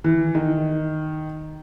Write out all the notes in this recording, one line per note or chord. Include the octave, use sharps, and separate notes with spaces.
E3
D#3